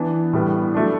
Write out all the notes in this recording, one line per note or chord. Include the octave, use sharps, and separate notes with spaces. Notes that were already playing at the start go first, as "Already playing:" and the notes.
Already playing: E3 B3 D4
A2 G3 B3
F#3 A3 D4